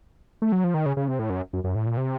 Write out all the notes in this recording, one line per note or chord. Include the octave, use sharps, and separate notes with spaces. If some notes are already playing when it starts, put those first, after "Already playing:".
A3
F#3
F3
D#3
C#3
C#3
C3
A2
F#2
F#2
F#2
A2
A#2
C3